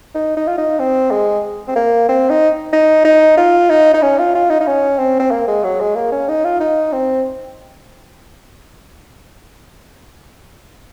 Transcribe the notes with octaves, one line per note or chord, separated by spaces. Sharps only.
D#4
D#4
F4
D#4
C4
G#3
C4
A#3
C4
D#4
D#4
D#4
F4
D#4
D#4
C#4
F4
F4
D#4
D#4
C#4
C4
C4
A#3
G#3
F#3
G#3
A#3
C#4
D#4
F4
D#4
C4